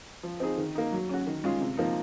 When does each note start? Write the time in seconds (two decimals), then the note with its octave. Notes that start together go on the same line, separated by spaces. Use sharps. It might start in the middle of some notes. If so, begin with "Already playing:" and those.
0.23 F3
0.40 C4 D#4 G#4
0.58 D#3
0.75 A#3 D#4
0.92 F#3
1.09 C#4 F#4
1.27 D#3
1.44 G#3 C#4 F4 G#4
1.61 C3
1.77 F3 A#3 D#4